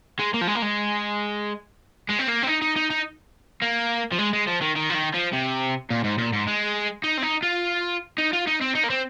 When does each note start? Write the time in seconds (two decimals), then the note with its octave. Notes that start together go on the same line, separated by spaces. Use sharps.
0.19 G#3
0.34 A#3
0.41 F3
0.47 G#3
0.55 A#3
0.62 G#3
2.10 G#3
2.20 C4
2.28 A#3
2.43 C4
2.47 D#4
2.62 D#4
2.76 D#4
2.90 D#4
3.62 A#3
4.12 F3
4.19 G#3
4.33 G#3
4.47 F3
4.62 D#3
4.76 D#3
4.90 F3
4.94 D#3
5.14 F3
5.33 C3
5.90 A#2
6.04 G#2
6.18 A#2
6.33 G#2
6.47 G#3
7.04 D#4
7.18 C4
7.22 D#4
7.43 F4
8.18 D#4
8.33 F4
8.47 D#4
8.61 C4
8.75 D#4
8.84 A#3
8.90 C4